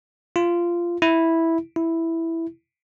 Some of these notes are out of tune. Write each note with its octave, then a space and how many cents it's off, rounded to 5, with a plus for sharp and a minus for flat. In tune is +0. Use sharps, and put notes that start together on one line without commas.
F4 -15
E4 -5
E4 +0